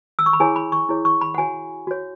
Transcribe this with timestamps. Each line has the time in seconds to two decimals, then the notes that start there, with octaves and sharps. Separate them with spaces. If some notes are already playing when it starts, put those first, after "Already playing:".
0.19 E6
0.26 C#6
0.33 B5
0.40 E4 G#4 C#5 G#5
0.56 B5
0.72 C#6
0.89 E4 G#4 C#5
1.05 C#6
1.21 B5
1.35 F#5
1.38 F#4 C#5 G#5
1.87 F#4 C#5